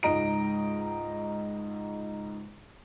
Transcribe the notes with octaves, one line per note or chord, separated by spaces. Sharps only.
C#2 G#2 D#5 A#5 D7